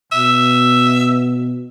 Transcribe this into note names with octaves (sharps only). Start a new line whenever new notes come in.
B2 E5